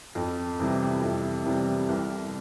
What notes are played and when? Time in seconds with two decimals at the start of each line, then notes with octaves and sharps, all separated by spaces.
0.15 F2
0.59 C3 E3 G3
1.02 F2
1.45 C3 E3 G3
1.89 C2